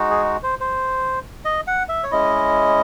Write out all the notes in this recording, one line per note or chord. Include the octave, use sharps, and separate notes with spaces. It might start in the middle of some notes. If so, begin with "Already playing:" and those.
Already playing: G#3 D#4 F#4
G#4
C5
C5
D#5
F#5
E5
C#5
G#3 C#4 E4 D#5